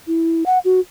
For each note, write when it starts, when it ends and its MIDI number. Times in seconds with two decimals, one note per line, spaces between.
0.07 0.44 64
0.46 0.59 78
0.65 0.80 66